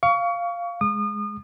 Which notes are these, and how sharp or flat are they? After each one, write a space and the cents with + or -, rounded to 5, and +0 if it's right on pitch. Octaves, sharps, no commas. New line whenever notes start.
F5 -5 C#6 +30
G#3 +5 D#6 -35